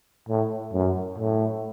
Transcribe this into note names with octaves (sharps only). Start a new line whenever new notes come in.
A2
F#2
A2